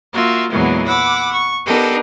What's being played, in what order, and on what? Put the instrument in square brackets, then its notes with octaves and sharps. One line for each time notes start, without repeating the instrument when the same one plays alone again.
[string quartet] A#3 F4 F#4 E5
E2 A#2 E3 F#3 G#3 B3
F#5 B5 D6 E6
C#6
B3 D4 D#4 G4 A4 A#4